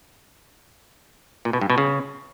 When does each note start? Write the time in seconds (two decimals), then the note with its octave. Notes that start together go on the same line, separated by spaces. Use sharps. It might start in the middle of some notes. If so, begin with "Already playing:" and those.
1.45 A#2
1.53 B2
1.61 G2
1.70 B2
1.78 C#3